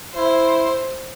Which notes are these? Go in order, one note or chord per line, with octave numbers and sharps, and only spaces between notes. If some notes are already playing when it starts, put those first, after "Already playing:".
E4 C5